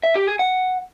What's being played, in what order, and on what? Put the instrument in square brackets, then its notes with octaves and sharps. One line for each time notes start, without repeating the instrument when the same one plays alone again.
[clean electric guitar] E5
G4
G#4
F#5